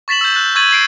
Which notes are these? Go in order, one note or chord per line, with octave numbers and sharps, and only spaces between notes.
C#6 A6 B6 E7 F#7
E6 G6
F#6
C#6 E6 G#6 A6 D#7 F#7
G#6 C7 D7